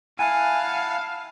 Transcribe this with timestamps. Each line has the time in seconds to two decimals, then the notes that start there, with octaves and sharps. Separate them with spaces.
0.19 E4 F5 F#5 G#5 A5